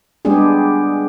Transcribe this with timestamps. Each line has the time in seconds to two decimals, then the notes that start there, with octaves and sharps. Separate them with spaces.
0.25 G3 G#3 B3 D4 G4 G#4